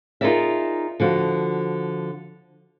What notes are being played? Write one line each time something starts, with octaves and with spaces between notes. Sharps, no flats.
D#4 F4 G#4 A#4 D5 E5
D3 F3 F#4